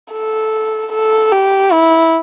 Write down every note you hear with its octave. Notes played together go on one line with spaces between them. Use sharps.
A4
A4
G4
E4